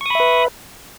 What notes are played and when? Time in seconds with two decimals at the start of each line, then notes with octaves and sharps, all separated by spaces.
0.01 C#6
0.06 D#6
0.10 B5
0.15 E5
0.20 B4